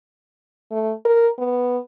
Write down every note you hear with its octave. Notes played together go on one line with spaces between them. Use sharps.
A3
A#4
B3